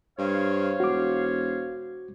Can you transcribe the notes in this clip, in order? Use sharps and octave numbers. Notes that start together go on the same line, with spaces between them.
G2 C5 C#5 F5
E1 F#4 D6